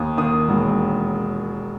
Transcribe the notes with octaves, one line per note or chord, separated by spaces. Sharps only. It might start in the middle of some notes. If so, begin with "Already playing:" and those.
Already playing: D#2 D#6
D#3 D#6
E1